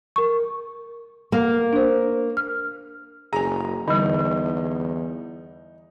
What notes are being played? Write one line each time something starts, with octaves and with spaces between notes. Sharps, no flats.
A#4 C#6
A#3
D4 C5
F6
F#1 G#4 G#5 A#5
E2 D3 G3 D#4